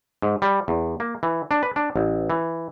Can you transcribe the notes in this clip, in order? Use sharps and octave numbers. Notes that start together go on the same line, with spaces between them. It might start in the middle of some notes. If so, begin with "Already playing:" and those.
G#2
G3
E2
A#3
E3
D4
B4
D4
A1
E3